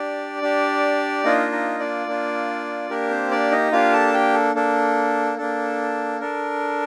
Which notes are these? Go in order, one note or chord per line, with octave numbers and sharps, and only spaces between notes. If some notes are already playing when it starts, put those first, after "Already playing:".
Already playing: D4 G4 D5
D4 G4
A#3 D4 D#4 F4 D#5
D#4 D#5
D4 D5
A#3 D4 F4
A#3 D4 G4 A#4
C4 C5
D4 D5
D#4 D#5
A#3 D4 F4 G4 F5
A4 A5
G4 G5
A4
A#3 D4 A4
A#3 D4 A4
D4 A4 A#4